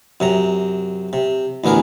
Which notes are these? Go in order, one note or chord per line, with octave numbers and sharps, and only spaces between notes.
F#2 C3 A#5
C3
A1 D2 B3 G#4 A#4